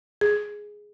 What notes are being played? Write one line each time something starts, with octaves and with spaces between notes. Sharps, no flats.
G#4